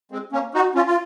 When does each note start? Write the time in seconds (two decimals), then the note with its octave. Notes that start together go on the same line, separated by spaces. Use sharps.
0.11 G#3 C4
0.32 A#3 C#4
0.54 D#4 F#4
0.75 C#4 F4
0.86 F4